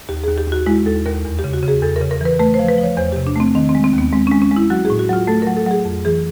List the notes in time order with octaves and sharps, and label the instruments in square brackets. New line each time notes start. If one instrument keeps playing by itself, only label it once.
[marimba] D#2 G4
D#2 G#4
G4
D#2 F#4
G#3 E4
D#2 A4
D#2 A#4
E2
G4
C#3
F#4
C#3
G#4
E2 A4
A#4
C#3
A#4
E3 B4
A3 B4
C5
F3
B4
F3
C#5
E2 C5
C3 G4
D4
A3 C4
D#3 C4
C4
G#3
C4
D#2 B3
G#3 C4
G#3 C#4
C#4
G#3
E4
F#3 F#4
A2 G#4
F#4
F#3 F4
A3 A4
F#3 A#4
A4
F#3 G#4
F2
E3 G#4